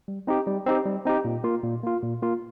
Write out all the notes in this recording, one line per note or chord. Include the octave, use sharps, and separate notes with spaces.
G3
C4 D#4 G4
G3
C4 D#4 G4
G3
C4 D#4 G4
A#2
A#3 F4
A#2
A#3 F4
A#2
A#3 F4